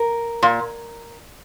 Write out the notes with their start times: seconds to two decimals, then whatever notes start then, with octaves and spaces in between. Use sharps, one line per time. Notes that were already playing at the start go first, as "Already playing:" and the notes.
Already playing: A#4
0.43 A#2